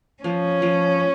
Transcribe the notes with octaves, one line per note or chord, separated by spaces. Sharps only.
F3 C#4
F3